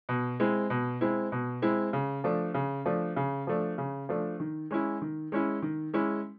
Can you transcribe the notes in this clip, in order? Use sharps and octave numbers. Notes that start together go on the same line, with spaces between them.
B2
G#3 C4 E4
B2
G#3 C4 E4
B2
G#3 C4 E4
C#3
F3 A3 D4
C#3
F3 A3 D4
C#3
F3 A3 D4
C#3
F3 A3 D4
D#3
G#3 C#4 E4
D#3
G#3 C#4 E4
D#3
G#3 C#4 E4